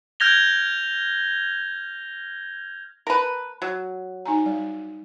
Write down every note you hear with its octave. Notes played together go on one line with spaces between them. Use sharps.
F6 G6 G#6 A#6 F7 G7
A#4 B4 A5 A#5
F#3
D#4 G#5 A#5
G3 D5